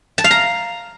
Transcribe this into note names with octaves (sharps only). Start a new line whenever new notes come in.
A5
F5
A#5